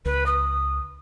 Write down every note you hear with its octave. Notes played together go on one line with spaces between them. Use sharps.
C#2 B4
D#6